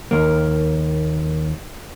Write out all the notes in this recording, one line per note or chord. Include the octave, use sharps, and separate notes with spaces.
D#2 A#3